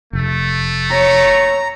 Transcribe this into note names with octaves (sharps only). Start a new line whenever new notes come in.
F1 A3
C#5 A#5